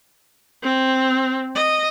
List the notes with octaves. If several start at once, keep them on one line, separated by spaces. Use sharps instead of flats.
C4
D#5